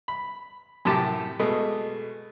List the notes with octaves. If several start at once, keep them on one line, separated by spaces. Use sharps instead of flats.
B5
F#2 A2 C3 G4 A5 D6
B2 G#3 A3